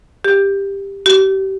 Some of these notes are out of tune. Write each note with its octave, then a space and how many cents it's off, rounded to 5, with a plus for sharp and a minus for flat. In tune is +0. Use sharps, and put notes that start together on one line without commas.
G4 +10
G4 -30